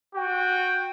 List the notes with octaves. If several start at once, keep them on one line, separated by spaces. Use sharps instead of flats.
F#4 G5